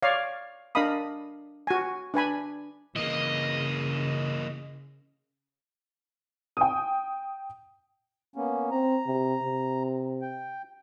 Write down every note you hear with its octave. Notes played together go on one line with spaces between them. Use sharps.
C#5 D5 F5
D4 A#4 D#5 F5 B5 D#6
F#4 G#5
D4 B4 G#5 B5
C#3 E3 A#3 D#5
G5 D#6
A#3 B3 C#4
C4 A#5
C3
C3
G5